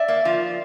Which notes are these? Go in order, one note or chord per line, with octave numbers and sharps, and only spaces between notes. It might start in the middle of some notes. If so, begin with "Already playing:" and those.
Already playing: D5 E5
A#3
F3